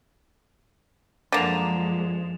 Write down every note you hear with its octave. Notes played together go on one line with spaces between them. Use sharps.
F#2 D3 F3 G#3 A#3 A6 E7 F7